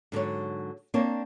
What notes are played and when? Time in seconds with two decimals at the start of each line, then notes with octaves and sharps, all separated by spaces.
0.12 G#2 D3 F#3 C#5
0.94 A#3 C4 D4 A#4 C#5